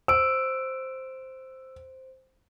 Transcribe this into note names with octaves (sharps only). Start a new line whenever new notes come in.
C5 E6 D7